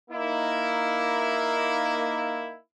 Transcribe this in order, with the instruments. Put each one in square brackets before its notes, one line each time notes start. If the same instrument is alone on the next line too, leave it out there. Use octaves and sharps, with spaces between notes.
[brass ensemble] A#3 D#4 E4